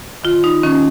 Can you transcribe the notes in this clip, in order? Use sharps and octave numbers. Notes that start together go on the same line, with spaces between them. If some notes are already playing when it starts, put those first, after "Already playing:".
D#3 F4
D#4
D#3 C#4